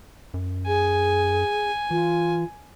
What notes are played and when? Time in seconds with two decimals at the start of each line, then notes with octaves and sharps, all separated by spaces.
0.34 F#2
0.67 G#4 G#5
1.91 E3 F4